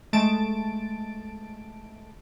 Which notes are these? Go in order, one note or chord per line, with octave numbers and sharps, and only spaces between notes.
G#3 A3 A5 A6 D7